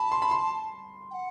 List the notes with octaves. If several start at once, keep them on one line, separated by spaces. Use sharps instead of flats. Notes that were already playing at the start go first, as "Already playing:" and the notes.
Already playing: A5 B5
C6
B5
C6
G5
F#5